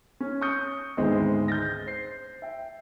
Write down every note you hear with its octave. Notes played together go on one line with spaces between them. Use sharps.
C#4
C#6 D#6 G6 C#7
D2 G#2 D#3 G#3 B3 C4
G6 A6 A#6
C5 C7
E5 G5